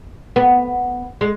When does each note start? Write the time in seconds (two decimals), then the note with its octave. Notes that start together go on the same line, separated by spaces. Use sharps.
0.36 B3
1.21 G#3